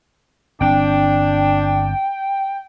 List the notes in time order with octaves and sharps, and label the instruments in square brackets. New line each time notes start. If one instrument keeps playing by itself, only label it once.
[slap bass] G1 C4 [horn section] D4 [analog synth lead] G5